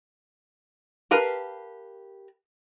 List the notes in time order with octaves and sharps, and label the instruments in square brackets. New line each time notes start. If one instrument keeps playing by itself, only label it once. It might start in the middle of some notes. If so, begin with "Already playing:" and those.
[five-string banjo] G4 A#4 B4 F5 A5